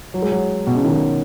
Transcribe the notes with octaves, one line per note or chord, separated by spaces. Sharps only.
F#3
G#3
F#3
B2
C#3
D#3